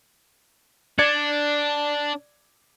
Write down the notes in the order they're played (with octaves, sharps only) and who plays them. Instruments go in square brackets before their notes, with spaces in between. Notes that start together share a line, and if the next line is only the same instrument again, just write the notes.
[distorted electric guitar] D4 [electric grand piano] D5 G#6 C#7